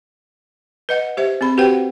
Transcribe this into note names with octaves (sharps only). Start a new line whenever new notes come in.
B4 D#5 F#5
G4 C5 E5
C4 G#4 B5
F#4 G4 B4 C5 F#5 G5